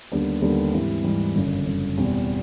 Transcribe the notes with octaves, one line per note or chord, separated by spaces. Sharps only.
D#2 D3 G3 B3 D4
D#2 D3 G3 B3 D4
G#2 E3 G3 C4 E4
G#2 E3 G3 C4 E4
G1 F#2 C#3
G1 F#2 C#3
E2 B2 G3 C4